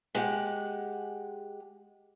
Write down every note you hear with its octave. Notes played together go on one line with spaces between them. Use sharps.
G#3 G4 F#5